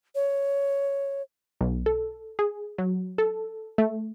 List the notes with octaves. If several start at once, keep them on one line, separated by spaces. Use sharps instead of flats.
C#5
B1
A4
G#4
F#3
A4
A3